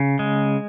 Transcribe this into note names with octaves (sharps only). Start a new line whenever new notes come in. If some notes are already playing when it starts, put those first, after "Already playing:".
Already playing: C#3
G#3